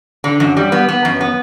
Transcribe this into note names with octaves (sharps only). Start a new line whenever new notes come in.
D3
F#2
G3
B3
B3
F#2
B3